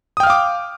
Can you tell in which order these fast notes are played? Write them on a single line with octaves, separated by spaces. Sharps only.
D#6 G5 F6 F5 D6